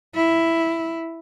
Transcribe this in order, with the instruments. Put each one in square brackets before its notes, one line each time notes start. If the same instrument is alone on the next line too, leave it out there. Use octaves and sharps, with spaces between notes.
[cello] E4